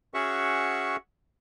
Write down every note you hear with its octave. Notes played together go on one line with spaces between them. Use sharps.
C#4 F#4 G#4 E5 F#5 C#6